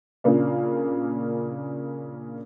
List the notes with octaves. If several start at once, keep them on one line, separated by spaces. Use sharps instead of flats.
A#2 C#3 A#3 D4